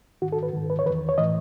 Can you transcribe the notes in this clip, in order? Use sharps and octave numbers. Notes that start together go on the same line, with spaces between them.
G#2 D#3 F#4
A4
B4
G#2 D#3
B4
C#5
E2 D#3 B4
C#5
A2 E3 D#5